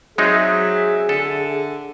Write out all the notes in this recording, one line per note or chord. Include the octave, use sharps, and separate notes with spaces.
F#3 G#3 C4 D#4 G#4 E5
D3 A4